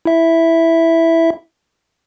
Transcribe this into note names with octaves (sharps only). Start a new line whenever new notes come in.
E4 E5